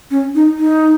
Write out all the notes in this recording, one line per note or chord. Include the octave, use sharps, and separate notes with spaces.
C#4
D#4
D#4